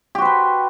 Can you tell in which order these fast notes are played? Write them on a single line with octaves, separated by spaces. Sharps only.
G4 F#4 C5 B4